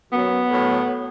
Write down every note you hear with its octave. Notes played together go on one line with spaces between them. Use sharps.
F#2 B3
F#3
A2 F#3